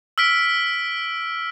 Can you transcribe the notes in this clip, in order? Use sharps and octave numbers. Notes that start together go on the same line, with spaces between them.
E6 F6 B6 D7